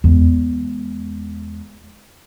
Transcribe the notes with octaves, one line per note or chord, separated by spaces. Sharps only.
E2 G#3